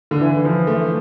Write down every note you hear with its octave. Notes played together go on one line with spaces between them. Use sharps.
D3
E3
F3
A3